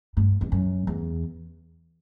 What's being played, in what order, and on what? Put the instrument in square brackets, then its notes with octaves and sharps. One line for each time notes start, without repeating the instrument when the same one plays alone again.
[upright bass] G2
E2
F#2
E2